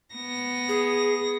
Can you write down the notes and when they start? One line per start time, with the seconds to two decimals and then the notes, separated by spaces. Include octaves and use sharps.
0.15 B3 A#6
0.69 G#4